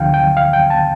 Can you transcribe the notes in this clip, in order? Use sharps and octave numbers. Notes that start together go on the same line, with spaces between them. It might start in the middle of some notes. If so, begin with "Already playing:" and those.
Already playing: D2 D3 F3 F5 G5
G5
F5
G5
A5